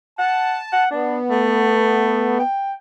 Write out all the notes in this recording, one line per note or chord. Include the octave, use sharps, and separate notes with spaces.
F#5 A5
F#5
B3 D4
A3
G5